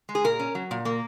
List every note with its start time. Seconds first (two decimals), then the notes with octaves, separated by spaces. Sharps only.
0.09 G#3
0.15 G#4
0.24 A#2 A#4
0.39 C#4
0.55 F#3
0.71 A#2
0.85 A#3